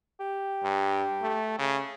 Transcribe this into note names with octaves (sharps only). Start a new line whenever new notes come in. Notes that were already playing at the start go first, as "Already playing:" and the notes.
G4
G2
A3
C#3